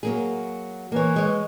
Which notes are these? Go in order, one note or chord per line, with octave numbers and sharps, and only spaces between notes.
F#3 A#3 G#4
E3 A#3 C#5
G#3 C#5